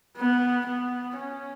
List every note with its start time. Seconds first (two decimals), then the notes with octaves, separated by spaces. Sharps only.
0.17 B3
0.66 B3
1.15 C#4